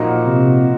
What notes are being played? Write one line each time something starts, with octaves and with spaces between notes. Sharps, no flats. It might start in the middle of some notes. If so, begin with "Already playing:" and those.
Already playing: A#2 F3 A#3 D#4 F#4
C3